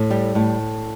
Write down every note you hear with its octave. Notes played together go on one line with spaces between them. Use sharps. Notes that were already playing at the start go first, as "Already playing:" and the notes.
Already playing: A2
G3
A2